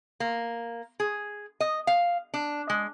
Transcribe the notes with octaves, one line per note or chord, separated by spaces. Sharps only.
A#3
G#4
D#5
F5
D4
G#3